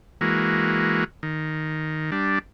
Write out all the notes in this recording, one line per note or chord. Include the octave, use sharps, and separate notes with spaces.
E3 G#3 A#3 F#4
D#3
G3 D4